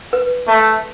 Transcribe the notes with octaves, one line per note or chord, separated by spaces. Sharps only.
B4
A3